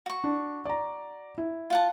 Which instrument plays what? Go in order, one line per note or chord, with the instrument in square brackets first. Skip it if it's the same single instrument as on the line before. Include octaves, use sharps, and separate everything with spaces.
[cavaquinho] F#4 C#6
[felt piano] D4
D5 A#5
E4
[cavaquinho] F4 F#5 A5